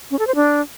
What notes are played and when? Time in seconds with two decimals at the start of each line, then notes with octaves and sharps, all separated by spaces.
0.11 C#4
0.19 A4
0.27 C5
0.35 D4